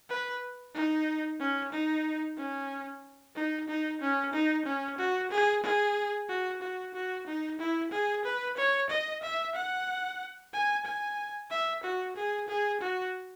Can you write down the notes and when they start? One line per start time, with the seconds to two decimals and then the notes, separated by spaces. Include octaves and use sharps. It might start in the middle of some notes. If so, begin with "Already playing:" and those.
0.10 B4
0.75 D#4
1.40 C#4
1.73 D#4
2.38 C#4
3.36 D#4
3.68 D#4
4.01 C#4
4.33 D#4
4.66 C#4
4.99 F#4
5.31 G#4
5.64 G#4
6.29 F#4
6.62 F#4
6.94 F#4
7.27 D#4
7.59 E4
7.92 G#4
8.25 B4
8.57 C#5
8.90 D#5
9.23 E5
9.55 F#5
10.53 G#5
10.85 G#5
11.51 E5
11.84 F#4
12.16 G#4
12.48 G#4
12.81 F#4